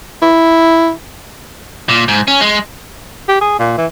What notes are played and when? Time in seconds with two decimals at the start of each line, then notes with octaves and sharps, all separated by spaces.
0.22 E4
1.89 A#2
2.08 G#2
2.28 C#4
2.41 G#3
3.28 G4
3.41 G#4
3.59 A#2
3.77 E3